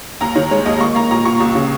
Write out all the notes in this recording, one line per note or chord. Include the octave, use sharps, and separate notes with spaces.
D#2 A#5
D#3 C#5
G#3 C#5
D#2 D#5
A#3 C#6
A#3 A#5
A#2 A#5
A#2 C#6
C#2
C#3